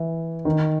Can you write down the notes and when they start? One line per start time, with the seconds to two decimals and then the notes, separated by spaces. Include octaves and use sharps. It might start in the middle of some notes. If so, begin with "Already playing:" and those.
Already playing: E3
0.45 D#3